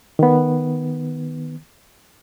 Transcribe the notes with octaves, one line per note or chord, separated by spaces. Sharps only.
D#3 B3